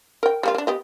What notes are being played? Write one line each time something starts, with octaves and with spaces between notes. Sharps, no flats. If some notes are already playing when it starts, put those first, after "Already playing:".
A#4 G5
G3 A#3 F4
A#3 D4
B3 G4 D#5